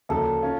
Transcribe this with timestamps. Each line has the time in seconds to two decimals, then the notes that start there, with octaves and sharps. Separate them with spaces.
0.09 D2 C#3 F3 A#3 A4
0.42 C#4 F4